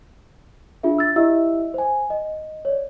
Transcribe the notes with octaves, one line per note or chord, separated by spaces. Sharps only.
D4 F4 G#4 E5
E6 A6
E4 G4 D#5 E5 E6
C5 G#5
D#5
C#5 D5